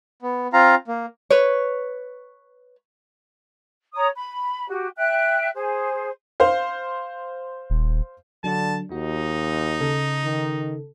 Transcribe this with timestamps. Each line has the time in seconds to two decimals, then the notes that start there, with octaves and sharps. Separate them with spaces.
0.22 B3
0.53 C4 F4 F5 A#5
0.88 A#3
1.30 B4 C#5
3.94 C#5 A#5 D#6
4.15 B5
4.69 F#4 G4
4.96 E5 G5 F#6
5.54 G#4 C5
6.40 C5 F5
7.70 D#1
8.44 D3 F#3 D4 A5
8.92 D#2 D#4 F#4
9.80 C#3 A4
10.24 D#3